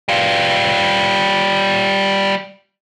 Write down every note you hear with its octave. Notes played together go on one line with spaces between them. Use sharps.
G3 F4